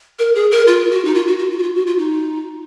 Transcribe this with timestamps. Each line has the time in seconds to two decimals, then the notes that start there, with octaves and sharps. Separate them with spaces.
0.19 A#4
0.35 G#4
0.51 A#4
0.67 F4
0.91 F#4
1.05 D#4
1.15 F4
1.27 F#4
1.39 F#4
1.51 F4
1.58 F#4
1.63 F4
1.75 F#4
1.87 F4
1.98 D#4